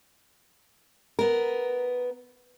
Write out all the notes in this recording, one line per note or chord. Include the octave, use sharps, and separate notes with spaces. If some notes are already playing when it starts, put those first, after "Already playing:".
B3 A#4